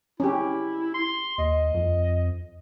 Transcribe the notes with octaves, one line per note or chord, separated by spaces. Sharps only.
C#4 E4 G4
C6
D#2 D#5
F2